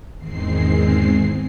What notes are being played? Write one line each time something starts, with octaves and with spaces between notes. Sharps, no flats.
E2 G#2 D#3 G#3 C4 C7